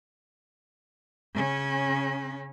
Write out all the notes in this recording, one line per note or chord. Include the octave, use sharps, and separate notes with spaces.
C#3 C#4